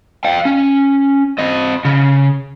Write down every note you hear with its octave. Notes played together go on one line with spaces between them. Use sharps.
F5 G5
C#4
C4 D#5
C#3